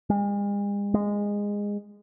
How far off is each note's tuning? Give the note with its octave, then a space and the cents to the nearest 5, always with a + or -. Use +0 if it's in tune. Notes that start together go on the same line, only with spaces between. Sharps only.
G#3 -45
G#3 -20